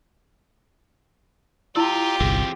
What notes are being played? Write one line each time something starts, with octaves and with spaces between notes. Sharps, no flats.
E4 F4 G4 D5 A#5 C6 E6
G1 C2 E3 C4 G#4